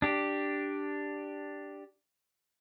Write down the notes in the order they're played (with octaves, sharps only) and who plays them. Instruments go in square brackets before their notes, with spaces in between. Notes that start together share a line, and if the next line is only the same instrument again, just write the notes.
[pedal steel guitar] D4 G4